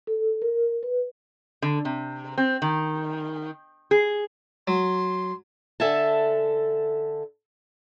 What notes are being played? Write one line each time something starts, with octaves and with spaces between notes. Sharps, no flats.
A4
A#4
B4
D3
C3
C4
D#3
G#4
F#3 C6
D3 A4 E5 G#5 A5